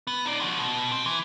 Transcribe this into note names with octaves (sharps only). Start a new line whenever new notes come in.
B3
D#4 D5
F3 F#4
B2
C4
E3